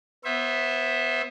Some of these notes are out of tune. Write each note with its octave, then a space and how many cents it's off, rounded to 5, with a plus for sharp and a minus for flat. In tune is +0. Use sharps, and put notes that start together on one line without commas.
B3 +0 C5 +40 E5 +0